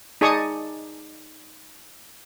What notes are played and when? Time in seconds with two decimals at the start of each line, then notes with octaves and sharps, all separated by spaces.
0.21 D#4 G#4 D5 A5 C#6 D#6